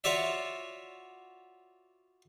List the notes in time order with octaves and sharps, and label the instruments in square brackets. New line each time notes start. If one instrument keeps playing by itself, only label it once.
[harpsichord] F4 F#4 C#5 D5 E5